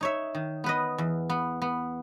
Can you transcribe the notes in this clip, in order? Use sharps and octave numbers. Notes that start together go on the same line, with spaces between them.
D#4 C#5 E5
D#3
B3 B4 D#5
E2
B3
B3